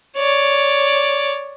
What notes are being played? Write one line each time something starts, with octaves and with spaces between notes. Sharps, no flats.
C#5 D5